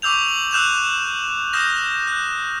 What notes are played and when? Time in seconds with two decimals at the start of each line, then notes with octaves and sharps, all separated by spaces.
0.02 C#6 D6 E6 G6 F7
0.29 F#7
0.51 E6 F#6 G6 E7 F7
1.53 D#6 F6 G6 A#6 E7
2.07 F#6